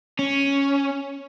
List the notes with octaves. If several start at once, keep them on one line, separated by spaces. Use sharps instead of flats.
C#4